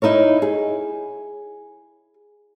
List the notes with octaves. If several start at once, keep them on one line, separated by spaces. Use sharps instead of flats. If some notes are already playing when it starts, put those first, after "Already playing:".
D#4 E4 A#4 C#5
G#4